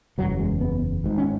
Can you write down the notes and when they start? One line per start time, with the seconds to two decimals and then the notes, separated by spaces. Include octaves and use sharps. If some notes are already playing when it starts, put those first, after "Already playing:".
0.18 F#1 E2 C#3 F#3
0.39 G#3
0.61 B3
1.04 G#1 G#2
1.18 C#4